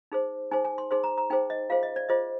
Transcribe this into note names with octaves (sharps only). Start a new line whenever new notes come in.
D#4 G#4 C5
D#4 G#4 C5 G#5
G#5
C6
D#4 G#4 C5 C6
A#5
A#5
D#4 G#4 C5 G5
D#5
F4 G#4 C5 F5
D#5
D5
F4 G#4 C5 D#5